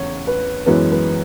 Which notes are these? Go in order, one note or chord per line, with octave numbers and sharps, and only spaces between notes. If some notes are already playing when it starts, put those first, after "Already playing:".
Already playing: E2 C#3 C#5
B4
F#2 E3 G#3 B3 B4
B4